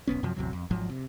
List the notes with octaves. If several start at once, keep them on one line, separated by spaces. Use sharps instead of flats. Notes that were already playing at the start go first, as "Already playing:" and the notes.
E1 B1 B3 C#4
F#2 C3 F3 F#3
A1 E2 C3 F#3
F2
G#1 G#2 F3 F#3
C3